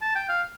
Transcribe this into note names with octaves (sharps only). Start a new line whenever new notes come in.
A5
G5
F5